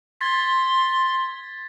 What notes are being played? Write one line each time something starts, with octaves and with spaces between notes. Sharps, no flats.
C6 G#6 A6 B6